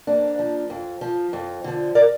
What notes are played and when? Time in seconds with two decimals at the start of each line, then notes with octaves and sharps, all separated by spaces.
0.07 F2 A#3 D4
0.39 F3
0.70 F2
1.01 F3
1.33 F2
1.64 D3 F3
1.95 A#4 D5